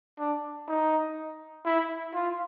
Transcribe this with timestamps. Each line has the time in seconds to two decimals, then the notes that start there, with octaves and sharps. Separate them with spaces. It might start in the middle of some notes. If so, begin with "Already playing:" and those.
0.19 D4
0.68 D#4
1.65 E4
2.14 F4